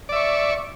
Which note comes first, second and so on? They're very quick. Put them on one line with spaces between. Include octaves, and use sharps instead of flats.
D5 E5 C#6